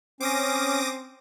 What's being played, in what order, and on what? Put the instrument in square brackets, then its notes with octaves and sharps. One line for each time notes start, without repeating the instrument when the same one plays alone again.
[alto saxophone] C4 [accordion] C#4 [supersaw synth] D6 D#6 A#6